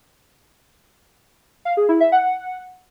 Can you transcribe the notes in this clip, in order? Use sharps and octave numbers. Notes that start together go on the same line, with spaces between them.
F5
G#4
E4
E5
F#5